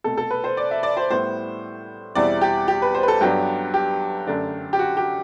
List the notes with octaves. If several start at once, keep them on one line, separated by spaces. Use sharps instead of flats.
C2 B2 A3 A4
A4
B4
C5
D5
E5
D5
C5
A2 G3 B3 E4 C5
E2 B2 G3 C4 E4 D5
G4
G4
B4
C5
B4
A4
G2 F#3 B3 D4 G4
G4
F#2 D3 A3 D4
G4
F#4
G4